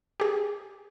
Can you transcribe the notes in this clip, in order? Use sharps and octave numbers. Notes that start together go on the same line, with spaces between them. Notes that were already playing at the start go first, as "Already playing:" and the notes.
G4 G#4